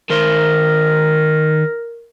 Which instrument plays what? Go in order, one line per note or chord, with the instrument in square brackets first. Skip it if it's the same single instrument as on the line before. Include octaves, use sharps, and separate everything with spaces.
[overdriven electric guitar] D#3 C5 [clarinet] A#4